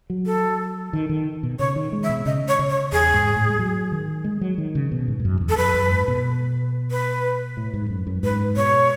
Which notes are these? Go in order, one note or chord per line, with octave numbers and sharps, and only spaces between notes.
F#3
A4
D#3
D#3
B2
C#3 C#5
D#3
G#3
E5
B2
C#3 D#5
C#5
C#3
C#5
E2 G#4
G#2
A2
G#3
F#3
D#3
G#3
F#3
D#3
C#3
B2
G#2
G#2
F#2
E2
A4
F#2 B4
F#2
G#2
B2
B4
A2
G#2
F#2
F#2
G#2 B4
B2 C#5